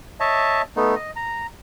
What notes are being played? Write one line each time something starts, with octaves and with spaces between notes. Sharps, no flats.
C#5 D#5 E5 A5
A3 B3 D#4
D#5
A#5